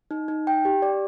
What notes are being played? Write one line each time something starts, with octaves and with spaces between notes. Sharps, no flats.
D#4
D#4
G5
G4
D5